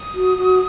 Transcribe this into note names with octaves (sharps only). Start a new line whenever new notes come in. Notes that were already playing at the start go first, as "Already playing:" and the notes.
Already playing: D#6
F#4
F#4